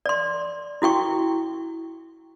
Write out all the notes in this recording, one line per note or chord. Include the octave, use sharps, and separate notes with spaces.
D5 C6
E4 F#4 G5 C#6